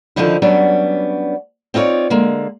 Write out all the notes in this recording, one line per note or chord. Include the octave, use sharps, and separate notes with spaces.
D3 D#3 F3 D#4 E4
F#3 G3 B3 C#4 D4
C4 D#4 F4 A4 C#5 D5
D3 G#3 A#3